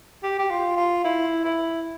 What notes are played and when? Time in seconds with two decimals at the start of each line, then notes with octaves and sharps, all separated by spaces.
0.23 G4
0.39 G4
0.51 F4
0.76 F4
1.04 E4
1.45 E4